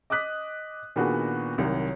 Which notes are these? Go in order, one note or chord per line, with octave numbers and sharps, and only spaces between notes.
D#5 D6 D#6 F#6 B6
A#2 D#3 B3 D4 F#4 G#4
C2 D#3 F#3